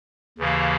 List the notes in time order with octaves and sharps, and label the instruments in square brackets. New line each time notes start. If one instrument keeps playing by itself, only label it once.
[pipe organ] D#2 C#3 E3 A#3